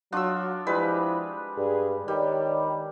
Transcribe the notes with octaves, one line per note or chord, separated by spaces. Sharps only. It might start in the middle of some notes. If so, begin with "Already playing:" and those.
F#3 D4 F4 F#4 D#6 E6
F3 G3 G#3 E4 B4
G2 G#4
D#3 G3 C#5 D5